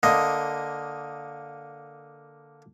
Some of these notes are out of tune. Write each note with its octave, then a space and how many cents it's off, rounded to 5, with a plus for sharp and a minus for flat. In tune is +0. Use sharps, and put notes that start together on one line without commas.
D3 +0 A#3 +5 D#5 +0